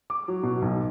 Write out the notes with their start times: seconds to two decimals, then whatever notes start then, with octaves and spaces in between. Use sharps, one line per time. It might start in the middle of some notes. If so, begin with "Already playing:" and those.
0.10 D6
0.28 F#3
0.43 B2
0.62 B1